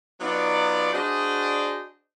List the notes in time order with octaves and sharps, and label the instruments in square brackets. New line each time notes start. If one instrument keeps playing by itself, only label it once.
[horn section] F#3 B3 D#4 F4 D5
D4 F#4 G#4 C5 D5 D#5